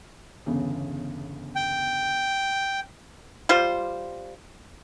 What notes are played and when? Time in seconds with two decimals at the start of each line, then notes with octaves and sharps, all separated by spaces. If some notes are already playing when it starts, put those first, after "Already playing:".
0.46 G1 E2 C#3
1.56 G5
3.49 G3 F4 C5